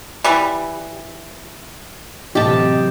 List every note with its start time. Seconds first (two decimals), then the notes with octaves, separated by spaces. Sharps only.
0.24 E3 G3
2.35 A1 C3 F#3 G4 D#5 A5